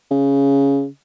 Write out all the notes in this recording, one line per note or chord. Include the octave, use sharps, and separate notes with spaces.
C#3